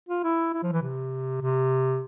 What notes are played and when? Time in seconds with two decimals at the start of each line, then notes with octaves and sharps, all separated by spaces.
0.09 F4
0.24 E4
0.53 E4
0.63 F3
0.72 E3
0.82 C3
1.41 C3